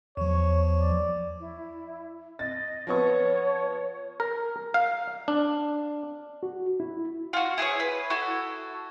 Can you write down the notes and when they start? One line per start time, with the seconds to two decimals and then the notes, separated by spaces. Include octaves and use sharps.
0.17 E2 F3 C#5
0.81 D5
1.40 E4
2.39 D#5 A6
2.87 F3 B3 C#5 C#6
4.20 A#4
4.74 F5
5.28 D4
6.43 F#4
6.80 E4
7.33 F4 F#4
7.58 E4 G#4 A4 C#5
7.80 B4
8.10 E4 F#4 A4